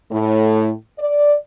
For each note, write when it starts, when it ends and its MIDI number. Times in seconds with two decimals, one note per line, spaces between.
0.11 0.71 45
0.99 1.36 74